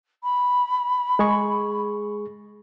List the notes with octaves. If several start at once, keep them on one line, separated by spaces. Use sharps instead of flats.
B5
G#3 G#4 C#6